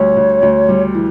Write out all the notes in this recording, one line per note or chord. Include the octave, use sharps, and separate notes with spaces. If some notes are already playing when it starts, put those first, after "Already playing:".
Already playing: D2 G3 C#5
D2
D2
G3
E3